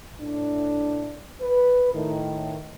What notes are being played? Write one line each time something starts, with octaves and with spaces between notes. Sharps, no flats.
A2 D4
B4
A2 D#3